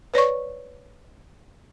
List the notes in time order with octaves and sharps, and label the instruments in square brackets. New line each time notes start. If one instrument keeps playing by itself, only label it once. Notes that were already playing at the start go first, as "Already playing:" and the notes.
[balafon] B4 C#5 D5 C#6